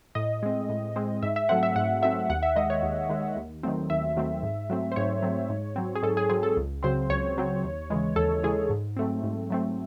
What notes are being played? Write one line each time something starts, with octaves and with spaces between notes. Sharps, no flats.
A2 D#5
G#3 C4
A2
G#3 C4
G#2 E5
E5
F#3 A3 C4 F#5
E5
G#2 F#5
F#3 A3 C4 E5
D#2 F#5
E5
D#3 G#3 D#5
C#5
D#2
D#3 G#3
D#2
D#3 F#3 A3 C4
D#2 E5
D#3 F#3 A3 C4
G#2
F#3 A3 C4
C5
G#2 C#5
F#3 A3 C4
G#2
F#3 C4
G#4
G#2 A4
G#4
F#3 C4 G#4
A4
C#2
C#3 F#3 C4 C5
C#2 C#5
C#3 F#3 C4
D#2
C#3 E3 G#3
D#2 A4
C#3 E3 G#3 G#4
G#2
F#3 A3 C4
G#2
F#3 A3 C4